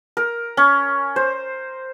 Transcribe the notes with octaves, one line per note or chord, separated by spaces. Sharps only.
A#4
C#4
C5